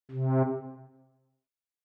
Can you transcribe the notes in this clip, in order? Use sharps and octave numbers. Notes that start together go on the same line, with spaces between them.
C3